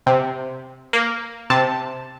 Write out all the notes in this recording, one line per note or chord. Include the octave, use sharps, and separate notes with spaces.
C3
A#3
C3 A5